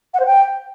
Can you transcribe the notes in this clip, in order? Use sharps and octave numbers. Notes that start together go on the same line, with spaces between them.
F#5
C5
G5